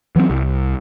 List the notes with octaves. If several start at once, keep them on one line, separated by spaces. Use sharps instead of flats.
E3 F#3 A3 C4
C2